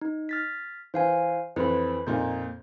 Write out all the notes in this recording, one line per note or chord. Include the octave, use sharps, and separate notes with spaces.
D#4
F6 A6 B6
E3 C5 F5 G#5
F2 E3 C4 B4 B5
F2 A#2 D#4 G6